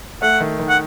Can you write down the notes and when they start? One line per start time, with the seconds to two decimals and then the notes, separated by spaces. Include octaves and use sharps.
0.22 A3 F#5
0.40 D#3
0.59 D#3
0.69 F#5